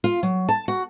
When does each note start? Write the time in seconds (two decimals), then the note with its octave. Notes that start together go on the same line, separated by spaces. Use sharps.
0.04 F4
0.23 F#3
0.49 A5
0.68 F#4